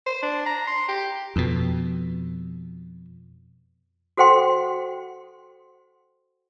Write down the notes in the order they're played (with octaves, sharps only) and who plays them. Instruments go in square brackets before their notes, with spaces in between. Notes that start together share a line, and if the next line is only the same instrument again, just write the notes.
[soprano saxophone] C5
D4
A#5
C6
G4
[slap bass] F2 B2
[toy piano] F#4 A4 C5 F#5 G5 C6